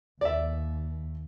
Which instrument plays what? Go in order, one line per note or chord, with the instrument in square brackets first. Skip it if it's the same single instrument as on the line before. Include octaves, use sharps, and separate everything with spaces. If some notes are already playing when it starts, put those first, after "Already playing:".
[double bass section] D#2 [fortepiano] D5 E5